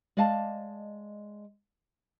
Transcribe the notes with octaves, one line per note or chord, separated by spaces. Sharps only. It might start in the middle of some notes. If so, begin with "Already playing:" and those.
G#3 D5 D#5 F5 A5